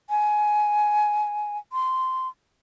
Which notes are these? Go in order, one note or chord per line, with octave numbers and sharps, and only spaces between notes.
G#5
C6